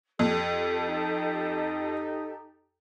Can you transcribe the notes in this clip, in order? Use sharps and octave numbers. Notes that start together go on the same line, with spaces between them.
F2 G4 A4
D#4